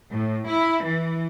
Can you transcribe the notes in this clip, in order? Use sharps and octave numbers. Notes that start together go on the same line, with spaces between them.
A2
E4
E3